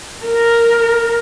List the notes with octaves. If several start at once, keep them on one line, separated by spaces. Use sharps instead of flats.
A#4